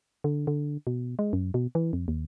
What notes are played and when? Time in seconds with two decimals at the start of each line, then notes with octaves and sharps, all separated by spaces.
0.24 D3
0.47 D3
0.87 B2
1.19 G#3
1.33 F#2
1.54 B2
1.75 E3
1.93 F2
2.08 D#2